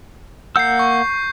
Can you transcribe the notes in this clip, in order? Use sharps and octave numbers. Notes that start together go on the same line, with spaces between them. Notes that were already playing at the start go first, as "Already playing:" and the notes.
A#3 F#5 E6 G6 C7
C#6